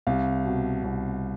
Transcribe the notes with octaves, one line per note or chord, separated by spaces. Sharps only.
C2 F5
B2
C2